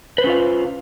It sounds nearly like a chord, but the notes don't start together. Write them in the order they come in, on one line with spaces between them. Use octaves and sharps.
B4 C5 C#4 F4 F5